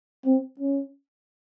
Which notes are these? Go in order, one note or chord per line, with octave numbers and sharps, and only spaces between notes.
C4
C#4